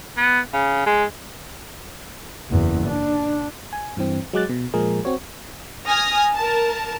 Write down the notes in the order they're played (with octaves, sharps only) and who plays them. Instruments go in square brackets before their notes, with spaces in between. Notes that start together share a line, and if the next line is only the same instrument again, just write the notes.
[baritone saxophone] B3
C#3
G#3
[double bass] F#1 E2
D4
[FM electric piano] G#5
G2 E3 C4
F#3 G#3 D6 F#6 A6
B2
A#2 F3 G#3 G#4 A#4
C4 F#4 C#5
[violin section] G#5 D#6 F6 A#6
A#4 A5